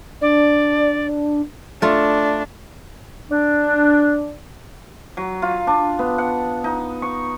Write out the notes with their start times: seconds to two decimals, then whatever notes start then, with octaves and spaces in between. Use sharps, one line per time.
0.21 D4 D5
1.82 A3 D4 F4
3.30 D4
5.17 F#3
5.42 F4
5.67 D4
5.99 B3
6.18 F#5
6.64 D#4
7.02 C#6